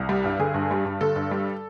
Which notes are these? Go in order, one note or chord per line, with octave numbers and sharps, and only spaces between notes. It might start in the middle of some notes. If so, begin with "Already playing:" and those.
Already playing: C2
G3
G2
D3 G#4
G2
G3
G2
D3 A4
G2
G3